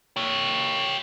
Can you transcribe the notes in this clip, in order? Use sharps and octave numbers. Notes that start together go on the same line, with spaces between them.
G4 C#5